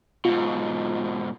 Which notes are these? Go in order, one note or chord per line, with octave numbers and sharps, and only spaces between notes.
G#2 B2 F4